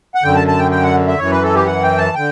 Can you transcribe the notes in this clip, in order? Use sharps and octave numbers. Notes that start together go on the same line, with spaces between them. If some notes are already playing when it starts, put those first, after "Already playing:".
F#5
F#2 D3 G5
A5
A5
G5
G5
F#5
E5
F#2 E3 C#5
B4
A4
G4
F#5
G5
A5
D3 G5